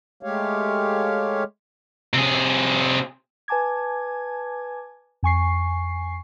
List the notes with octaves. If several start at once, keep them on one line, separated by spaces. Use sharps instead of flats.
G#3 A3 G4 C#5 F5
C3 G#4
B4 G#5 A5 D6 G#6
F2 G#5 C#6 C7